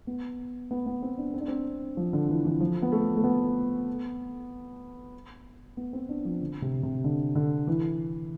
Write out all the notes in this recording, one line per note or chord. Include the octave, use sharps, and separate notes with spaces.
B3
B3
B3
C4
D4
C4
D4
C4
F3
D3
E3
E3
F3
B3
A3
A3
B3
B3
C4
D4
F3
D3
C3
C3
D3
D3
E3